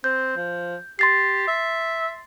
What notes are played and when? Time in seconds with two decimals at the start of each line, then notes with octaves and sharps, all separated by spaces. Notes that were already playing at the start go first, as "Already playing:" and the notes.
0.04 C4 G6
0.37 F3
0.99 G4 C6 A6 C7
1.47 E5